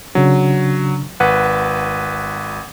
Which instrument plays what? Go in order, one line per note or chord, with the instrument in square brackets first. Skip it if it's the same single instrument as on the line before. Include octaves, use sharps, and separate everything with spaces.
[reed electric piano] C#3 D4 [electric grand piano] F#3
[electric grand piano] G#1 B4 [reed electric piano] F#5